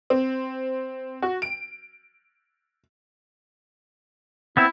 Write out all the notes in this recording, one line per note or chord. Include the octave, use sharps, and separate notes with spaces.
C4
F#4
D7
B3 C4 E4 E5